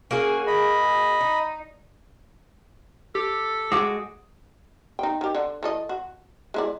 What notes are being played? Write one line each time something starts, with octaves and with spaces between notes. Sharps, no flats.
A#3 C#4 F#4 G#4
D#5 B5
D#4
G4 A4
G#3 F#4 D6 D#6
D#4 G5
D#3 G4
D3
E3 A4 D#5
F#4
G#3 E4 D5